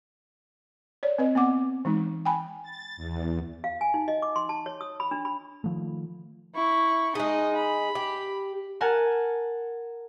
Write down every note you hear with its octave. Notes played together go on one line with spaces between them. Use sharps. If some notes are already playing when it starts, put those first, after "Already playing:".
C#5 D5
C4 B4 D#5
B3 C4 F#5 D6
E3 G#3 D#4
G5 G#5 B5
A6
E2
F5
G#5
D#4
D#5
D6
C6
A5
C#5
D#6
B5
D4
B5
D#3 F3 A3
E4 C#6
G#3 D#4 G#4 D#5
B5
G4
A#4 F#5 G#5 A5